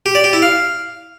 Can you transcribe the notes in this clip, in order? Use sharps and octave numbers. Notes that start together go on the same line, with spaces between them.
G4
D5
G4
E4
F5